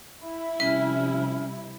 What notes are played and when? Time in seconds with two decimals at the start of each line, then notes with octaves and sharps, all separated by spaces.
0.24 E4
0.60 C3 F3 G3 C#4 E5